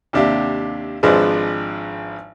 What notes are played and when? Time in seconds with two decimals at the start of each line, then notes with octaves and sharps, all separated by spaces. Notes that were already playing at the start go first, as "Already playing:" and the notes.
0.13 D#2 C3 D4 G4 E5 F5
1.03 G#1 F3 G#3 D4 G#4 B4